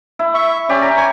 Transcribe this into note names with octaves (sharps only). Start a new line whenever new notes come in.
E4
E5 C#6
C#4 G4 D5
A#5
C#5 G#5